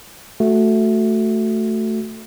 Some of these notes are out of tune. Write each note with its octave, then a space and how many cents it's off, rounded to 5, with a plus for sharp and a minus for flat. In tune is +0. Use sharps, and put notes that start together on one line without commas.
A3 +0 F#4 +0